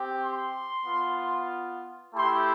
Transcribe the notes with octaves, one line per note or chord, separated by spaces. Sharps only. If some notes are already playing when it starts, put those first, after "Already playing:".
Already playing: C4 G4
C6
B3 F4
A3 E4 G4 C6